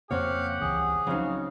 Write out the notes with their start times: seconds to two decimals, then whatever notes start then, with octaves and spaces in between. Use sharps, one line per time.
0.11 F2 C#3 A#3 C4 G4 C#5 F5 F#5
0.61 D#1 C#2 E3 G#4
1.07 C#3 F3 F#3 C4 D#4 F#4 F5